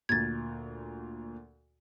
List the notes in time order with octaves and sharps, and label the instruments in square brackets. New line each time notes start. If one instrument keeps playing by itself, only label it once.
[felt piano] D2 A#2 [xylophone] G#6 A6